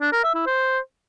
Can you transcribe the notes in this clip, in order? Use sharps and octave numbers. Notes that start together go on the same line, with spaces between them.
D4
A#4
E5
E4
C5